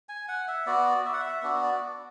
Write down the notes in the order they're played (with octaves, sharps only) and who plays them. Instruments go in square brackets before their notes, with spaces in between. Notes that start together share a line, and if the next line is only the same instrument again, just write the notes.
[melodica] G#5
F#5
E5
B3 F#4 D5
E5
F#5
E5
B3 D4 F#4
D5